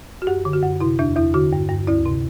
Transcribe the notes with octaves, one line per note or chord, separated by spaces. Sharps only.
F#4
F#2 G4
D3
F#4
F#2
C3 E4
E2 D4
E2 E4
D3 F#4
G2
G2
D2 E4
C3